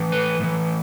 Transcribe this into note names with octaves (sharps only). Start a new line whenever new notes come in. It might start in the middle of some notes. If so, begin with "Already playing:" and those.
Already playing: A2 E3
B4
A2 E3